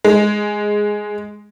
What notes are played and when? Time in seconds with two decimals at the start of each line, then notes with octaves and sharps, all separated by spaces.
0.04 G#3